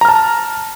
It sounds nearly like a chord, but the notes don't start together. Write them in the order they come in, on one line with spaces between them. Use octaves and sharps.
A#5 F6 A5